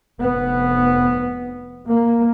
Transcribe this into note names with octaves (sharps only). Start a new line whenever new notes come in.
F1 B3
A#3